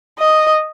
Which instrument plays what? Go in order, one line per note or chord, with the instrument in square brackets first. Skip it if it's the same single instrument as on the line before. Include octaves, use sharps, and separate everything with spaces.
[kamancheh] D#5